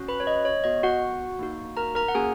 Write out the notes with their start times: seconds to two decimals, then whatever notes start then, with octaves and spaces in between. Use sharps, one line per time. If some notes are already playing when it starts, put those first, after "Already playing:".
Already playing: C#4 F#4
0.08 B4 B5
0.20 C#5
0.27 D#5
0.45 C#5
0.64 B3 F#4 D#5
0.83 F#4 F#5
1.39 A#3 D#4 F#4
1.77 A#4 A#5
1.95 A#4 A#5
2.08 F#5
2.15 A#3 C#4 F#4 G#4 G#5